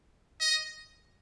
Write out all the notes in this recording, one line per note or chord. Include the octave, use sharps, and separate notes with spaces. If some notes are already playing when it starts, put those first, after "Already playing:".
D#5